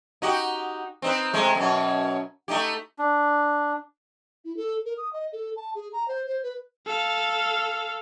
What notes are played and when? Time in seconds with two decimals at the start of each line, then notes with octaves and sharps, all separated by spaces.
0.22 D#4 F#4 G4
1.02 C4 D#4 B4
1.33 C3 G#3 A3
1.55 F#2 B2 C#4
2.48 A3 D#4 G4
2.99 D4
4.45 E4
4.57 A4
4.85 A#4
4.97 D#6
5.13 D#5
5.33 A4
5.56 A5
5.75 G#4
5.93 A#5
6.08 C5
6.26 C5
6.43 B4
6.87 A4 F5